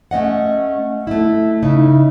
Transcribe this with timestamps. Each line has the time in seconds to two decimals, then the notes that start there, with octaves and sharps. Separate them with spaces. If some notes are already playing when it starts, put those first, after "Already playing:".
0.11 A3 C#4 D#5 F#5
1.07 A3 E4
1.63 C#3 D#4 E4